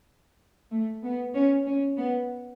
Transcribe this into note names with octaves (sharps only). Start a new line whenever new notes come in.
A3
B3
C#4
C#4
B3